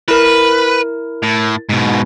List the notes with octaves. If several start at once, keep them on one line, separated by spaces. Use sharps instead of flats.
E4 A#4 B4
A2
G#2 B2